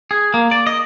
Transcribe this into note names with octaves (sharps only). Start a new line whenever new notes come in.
G#4
A#3
D5
D#5